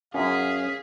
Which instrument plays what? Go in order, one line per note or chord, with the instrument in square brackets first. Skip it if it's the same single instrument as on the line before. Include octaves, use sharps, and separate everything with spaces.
[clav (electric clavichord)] F#2 [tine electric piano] C#4 [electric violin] G#4 B6 [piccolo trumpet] F5